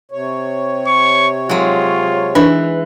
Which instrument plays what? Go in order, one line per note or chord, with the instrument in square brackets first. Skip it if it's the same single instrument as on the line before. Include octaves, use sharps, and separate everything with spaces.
[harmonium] C3 C#5
[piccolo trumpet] C#6
[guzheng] F#3 G#3 [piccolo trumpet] F4
[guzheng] E3 [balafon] D4